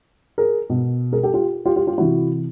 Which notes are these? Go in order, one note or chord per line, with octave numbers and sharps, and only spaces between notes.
G#4 A#4
B2
G#4 A#4
G4 A4
F4 G4
F4 G4
F4 G4
F4 G4
C3 E3 E4 F#4